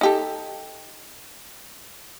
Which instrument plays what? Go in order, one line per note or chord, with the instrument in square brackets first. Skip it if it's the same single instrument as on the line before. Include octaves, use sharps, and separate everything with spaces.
[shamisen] D#4 G4 A4